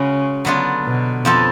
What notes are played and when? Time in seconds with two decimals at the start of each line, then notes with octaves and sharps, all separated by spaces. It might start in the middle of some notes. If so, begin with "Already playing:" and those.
Already playing: C#3 G#3 C#4 F#4 B4
0.45 D3 F#3 B3 D4 F4
0.85 B2
1.25 F2 F3 B3 F4 A4